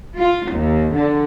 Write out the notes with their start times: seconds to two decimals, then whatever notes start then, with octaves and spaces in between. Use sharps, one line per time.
0.18 F4
0.52 D#2
0.93 D3